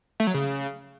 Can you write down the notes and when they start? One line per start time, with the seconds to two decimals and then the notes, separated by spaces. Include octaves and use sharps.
0.20 A3
0.27 F#3
0.34 C#3